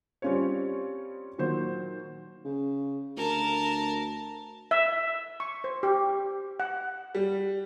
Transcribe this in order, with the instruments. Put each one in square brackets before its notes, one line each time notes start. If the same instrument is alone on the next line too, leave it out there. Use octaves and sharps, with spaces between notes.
[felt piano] G3 C4 C#4 F4 C#5
A#2 D#3 F#3 C5
[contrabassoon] C#3
[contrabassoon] D2 [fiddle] A#4 A5
[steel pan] E5
C#6
C5
G4
F#5
[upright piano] G3